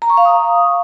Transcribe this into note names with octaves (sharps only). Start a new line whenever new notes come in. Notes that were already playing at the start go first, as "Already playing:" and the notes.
A#5
C#6
F5
D#6